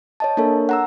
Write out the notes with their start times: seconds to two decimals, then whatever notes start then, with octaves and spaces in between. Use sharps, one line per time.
0.20 C#5 D#5 A5
0.37 A#3 D4 A4 A#4 C#5
0.69 F#5 A#5 E6